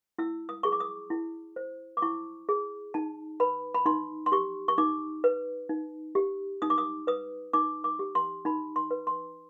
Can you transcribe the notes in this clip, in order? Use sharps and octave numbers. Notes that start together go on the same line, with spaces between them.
E4 E6
D#6
G#4 C#6
D6
D#6
E4
C5
D6
E4 C#6
G#4
D#4 A5
B4 B5
B5
D#4 C6
C6
G4 C#6
C#6
D#4 D6
B4
D#4
G4
D#4 D#6
D6
D#6
B4 D#6
D#4 D6
D6
G4
C6
D#4 B5
C6
B4
C6